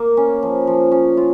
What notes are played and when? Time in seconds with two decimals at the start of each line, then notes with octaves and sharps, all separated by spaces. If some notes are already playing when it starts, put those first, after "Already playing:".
Already playing: A#3
0.17 C#4
0.42 F3
0.67 F3
0.92 C#4
1.17 F4